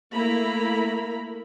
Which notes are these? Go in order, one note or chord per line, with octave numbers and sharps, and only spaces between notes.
A3 A#3 E4 A#5 B5